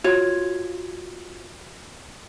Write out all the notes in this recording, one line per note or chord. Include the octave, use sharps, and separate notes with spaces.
F4 F#4 C#5